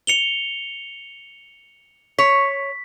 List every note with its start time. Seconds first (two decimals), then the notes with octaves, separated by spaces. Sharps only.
0.07 C#7 F7 G7
2.19 C#5 B6